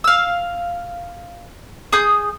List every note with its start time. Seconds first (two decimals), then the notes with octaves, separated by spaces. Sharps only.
0.04 F5 E6
1.93 G#4 D#6 G6